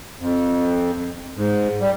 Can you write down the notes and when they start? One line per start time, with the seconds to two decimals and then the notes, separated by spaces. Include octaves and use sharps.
0.20 F2
1.37 G#2
1.81 G3